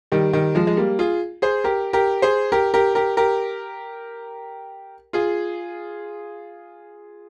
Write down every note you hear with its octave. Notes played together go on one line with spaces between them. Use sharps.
D#3 G3
D#3 G3
F3 G#3
G#3
G3 A#3
F4 G#4
G#4 C5
G4 A#4
G4 A#4
G#4 C5
G4 A#4
G4 A#4
G4 A#4
G4 A#4
F4 G#4